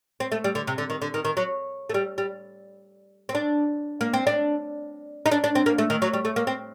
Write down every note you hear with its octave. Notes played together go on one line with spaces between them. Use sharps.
C4
A3
G3
D3
C3
D3
D#3
D3
D#3
D#3
F#3
A3
G3
G3
C4
D4
A#3
C4
D4
D#4
D4
D4
C4
A#3
A3
D#3
F#3
G3
A3
A#3
C4